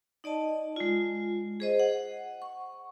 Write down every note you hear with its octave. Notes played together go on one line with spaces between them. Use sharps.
D#4 D5 D#5 A5
G#3 F4
G#4 C5 D#5
F#5
C#6